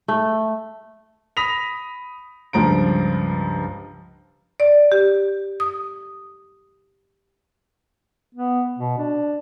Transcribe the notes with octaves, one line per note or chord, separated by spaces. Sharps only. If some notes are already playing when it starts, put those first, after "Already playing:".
A3
B5 D#6 A#6 B6 F7
C#2 G2 F3 A#5 D7
D5
G4
D#6
B3
B2
D4